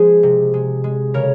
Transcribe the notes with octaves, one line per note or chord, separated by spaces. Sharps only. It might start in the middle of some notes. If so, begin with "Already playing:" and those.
Already playing: F3 G#3 G#4 C5
C3
G#3
G#3
C#3 A#4 C#5